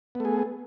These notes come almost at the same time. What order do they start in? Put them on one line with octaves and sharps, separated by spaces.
B3 A3 G#4